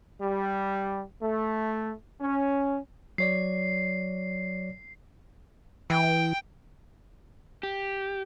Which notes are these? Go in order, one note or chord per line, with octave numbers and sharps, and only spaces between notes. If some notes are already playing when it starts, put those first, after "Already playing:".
G3
A3
C#4
F#3 C#5 D5 C7
E3 G5
G4